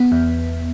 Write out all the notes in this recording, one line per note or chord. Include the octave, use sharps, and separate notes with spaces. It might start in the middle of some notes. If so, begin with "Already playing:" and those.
Already playing: B3
E2